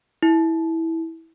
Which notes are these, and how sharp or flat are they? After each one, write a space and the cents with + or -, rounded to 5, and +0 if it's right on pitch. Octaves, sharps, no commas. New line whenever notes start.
E4 -15